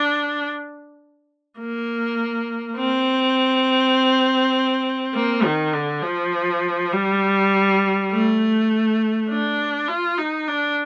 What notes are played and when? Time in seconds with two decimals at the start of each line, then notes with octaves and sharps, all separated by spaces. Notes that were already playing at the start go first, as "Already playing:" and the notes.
Already playing: D4
1.58 A#3
2.77 C4
5.15 A#3
5.44 D#3
5.73 D3
6.03 F3
6.92 G3
8.11 A3
9.29 D4
9.88 F4
10.18 D#4
10.48 D4